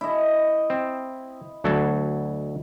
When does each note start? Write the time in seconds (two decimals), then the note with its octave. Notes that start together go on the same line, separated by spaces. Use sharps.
0.01 E4 D#5
0.70 C4
1.64 D2 F#3 A4